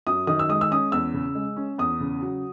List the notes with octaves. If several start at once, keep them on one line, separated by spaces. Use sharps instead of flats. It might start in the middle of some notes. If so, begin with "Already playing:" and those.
F#2 D#6
D#3 D#6
E6
G#3 D#6
E6
C#4 D#6
E2 E6
C#3
G#3
C#4
E2 D#6
C#3
F#3